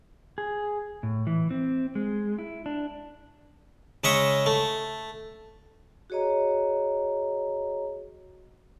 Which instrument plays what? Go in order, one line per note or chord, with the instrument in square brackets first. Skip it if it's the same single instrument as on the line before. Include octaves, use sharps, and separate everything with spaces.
[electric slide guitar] G#4
A2
E3
C4
G#3
E4
D4
[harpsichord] C#3 G#3 D#5 E5 C#6 D#6
A3
[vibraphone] F#4 G#4 C#5 D#5 A#5